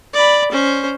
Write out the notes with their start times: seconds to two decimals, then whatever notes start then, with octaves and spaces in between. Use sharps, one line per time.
0.14 D5 B5
0.51 C#4 C5